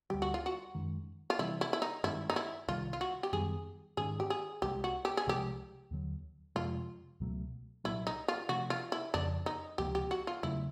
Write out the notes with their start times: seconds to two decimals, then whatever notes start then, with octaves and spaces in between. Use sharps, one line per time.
0.10 D2 D3 G3 G4
0.22 F#4
0.34 F4
0.46 F#4
0.75 F#2 D#3 G#3
1.30 F4
1.39 C3 E3 G3 C4 E4
1.61 E4
1.73 E4
1.82 D#4
2.04 G2 D#3 G#3 C#4 E4
2.30 D#4
2.36 E4
2.68 C2 C3 D#3 G3 F4
2.93 F4
3.01 F#4
3.23 G4
3.33 F#2 D#3 G3 B3 G#4
3.97 G#2 D#3 G#3 C#4 G#4
4.20 G4
4.30 G#4
4.62 C2 C3 D#3 G#3 G4
4.84 F#4
5.05 G4
5.17 G#4
5.26 C2 C3 F3 G#3 G4
5.91 D#2 D3 F#3
6.56 F2 C3 F3 G#3 F4
7.20 C#2 B2 F#3 A3
7.84 C2 A#2 F#3 A#3 E4
8.07 D#4
8.28 F4
8.49 C3 F3 A3 D4 F#4
8.70 F4
8.92 E4
9.14 F2 C#3 F3 D4
9.46 D#4
9.78 C#2 C3 F3 A#3 G4
9.95 G4
10.11 F#4
10.27 F4
10.43 E2 C#3 F#3 A3 E4